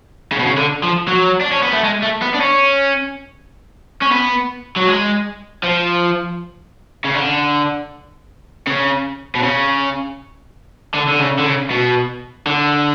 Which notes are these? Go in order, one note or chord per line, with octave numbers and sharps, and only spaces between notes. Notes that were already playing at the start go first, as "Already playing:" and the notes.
C#3
B2
C#3
D3
F3
F#3
D4
C#4
B3
A3
G#3
A3
B3
D4
C#4
C#4
B3
F#3
G#3
F3
C#3
D3
C#3
B2
C#3
D3
D3
C#3
D3
C#3
B2
D3